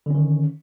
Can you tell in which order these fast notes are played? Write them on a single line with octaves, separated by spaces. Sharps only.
D3 C#4 D#3